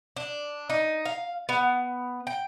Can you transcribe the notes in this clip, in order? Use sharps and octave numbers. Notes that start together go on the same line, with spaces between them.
D4
D#4
F5
B3
G5